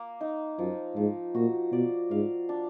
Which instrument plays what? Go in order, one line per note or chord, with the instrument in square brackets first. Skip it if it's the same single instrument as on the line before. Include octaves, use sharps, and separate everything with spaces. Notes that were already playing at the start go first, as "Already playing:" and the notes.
Already playing: [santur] A#3
D#4
[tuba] F#2 [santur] F3
[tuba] G#2 [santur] F3
[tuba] A#2 [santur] F#4
[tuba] B2 [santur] D5
[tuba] G#2 [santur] F5
[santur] D4